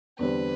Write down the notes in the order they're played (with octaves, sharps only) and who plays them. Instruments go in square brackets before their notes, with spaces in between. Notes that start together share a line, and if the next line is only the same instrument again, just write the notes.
[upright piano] E2 D3 G3 C4 [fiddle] B4